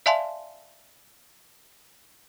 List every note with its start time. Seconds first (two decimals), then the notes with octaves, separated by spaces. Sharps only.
0.06 D5 E5 F5 G#5 A5 C6